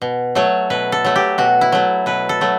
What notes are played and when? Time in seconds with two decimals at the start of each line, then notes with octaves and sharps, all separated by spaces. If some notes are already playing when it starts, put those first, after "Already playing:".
0.02 B2
0.35 F#3 A3 C#5
0.70 B2 B4
0.92 A4
1.05 F#3 A3
1.16 G4
1.38 B2 F#4
1.61 E4
1.72 F#3 A3
2.06 B2 B4
2.29 A4
2.41 F#3 A3